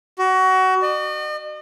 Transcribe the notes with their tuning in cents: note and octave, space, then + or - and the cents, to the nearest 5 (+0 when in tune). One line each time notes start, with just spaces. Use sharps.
F#4 +25
D#5 -45